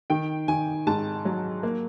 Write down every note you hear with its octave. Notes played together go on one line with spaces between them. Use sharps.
D#3 G5
D#3 G#5
G#2 A5
F#3
A#3